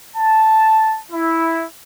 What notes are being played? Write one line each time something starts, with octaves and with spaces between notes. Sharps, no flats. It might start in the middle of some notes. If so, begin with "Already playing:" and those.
A5
E4